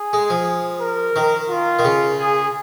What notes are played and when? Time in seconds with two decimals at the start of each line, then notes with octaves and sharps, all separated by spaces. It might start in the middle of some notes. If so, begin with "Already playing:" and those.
Already playing: G#4
0.13 G#3
0.30 F3
0.81 A#4
1.16 D#3
1.50 F4
1.79 D#3
1.84 C#3
2.19 G#4